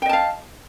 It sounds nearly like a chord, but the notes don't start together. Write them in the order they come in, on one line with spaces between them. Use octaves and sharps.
G5 D#5 A5 F5